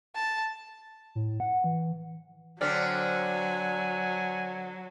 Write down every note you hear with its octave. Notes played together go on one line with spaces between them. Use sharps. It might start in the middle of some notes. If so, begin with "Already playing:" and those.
A5
A2
F#5
E3
D3 F#3 C4 D5 G#5 F6 B6